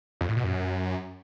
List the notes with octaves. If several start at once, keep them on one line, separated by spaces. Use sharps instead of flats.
F2
A2
B2
F#2